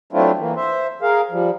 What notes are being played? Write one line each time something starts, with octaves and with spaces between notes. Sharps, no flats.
F#3 A3 C4 D4 E4 F4
E3 A#3
C5 E5
G#4 A#4 F5
F3 G3